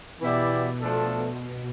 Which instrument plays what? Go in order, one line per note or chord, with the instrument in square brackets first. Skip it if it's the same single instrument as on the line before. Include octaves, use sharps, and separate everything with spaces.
[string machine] B2 [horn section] E3 B3 E4 G4 D5
[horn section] F3 A3 D4 A4